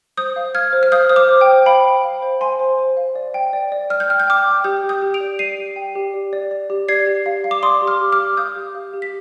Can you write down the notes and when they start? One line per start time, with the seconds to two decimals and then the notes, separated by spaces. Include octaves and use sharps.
0.17 C5 D#6 G6
0.36 F5
0.55 F5 F6 G#6
0.73 C5
0.83 F6
0.92 F5 D#6 G6
1.09 C5 D#6
1.16 D6 F6
1.29 C5
1.41 G5
1.48 C5
1.66 F5 G5 B5
1.85 C5
2.04 F5
2.22 C5
2.41 F5 G#5 C6
2.60 C5
2.78 C5
2.97 F5
3.16 D5
3.34 G5
3.53 D5
3.72 D5
3.90 D5 F6
4.00 G6
4.09 G5 F6
4.20 G6
4.27 G5 D6 F6
4.46 G5
4.64 G4 D#6 G6
4.83 G5
4.89 D#6 G6
5.02 G4
5.14 D7 F7
5.20 D5
5.39 D5 C7 D#7
5.58 G4
5.76 G5
5.95 G4
6.14 D5
6.33 D5
6.51 D5
6.70 G4
6.88 D5 G#6 C7
7.07 G4
7.26 F5
7.44 F5
7.51 D6
7.63 D5 C6 D#6
7.82 G4
7.87 D6 F6
8.00 G4
8.12 D6 F6
8.19 F5
8.37 F5 D#6 G6
8.56 G4
8.75 F5
8.94 G4
9.02 B6